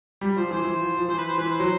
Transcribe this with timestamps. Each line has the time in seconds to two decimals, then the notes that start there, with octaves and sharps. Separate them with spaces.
0.21 G3
0.36 F3 C5
0.51 E3 C5
0.65 E3
0.80 F3
0.97 F3
1.09 E3 C5
1.18 B4
1.28 C5
1.38 E3 B4
1.52 C5
1.59 F#3